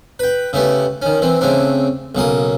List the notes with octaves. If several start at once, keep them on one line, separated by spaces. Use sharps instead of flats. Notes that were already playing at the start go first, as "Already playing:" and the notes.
B4 G5
C#3 A3 B3 G4
D#3 C#4
E3 C4
C#3 A3 C4 D4
B1 C#3 A#3 D#6